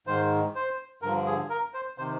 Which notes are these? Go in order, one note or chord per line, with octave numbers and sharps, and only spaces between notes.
G#2 D#3 C5
C5
G2 D3 F3 A#4
G#4
A#4
C5
C3 D#3 C5